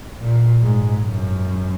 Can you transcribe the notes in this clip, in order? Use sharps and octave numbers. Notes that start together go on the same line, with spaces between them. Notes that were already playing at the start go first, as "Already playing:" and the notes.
A#2
G#2
F#2